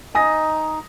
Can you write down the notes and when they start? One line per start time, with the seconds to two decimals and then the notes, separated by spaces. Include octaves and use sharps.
0.15 D#4 G#5 D#6 A#6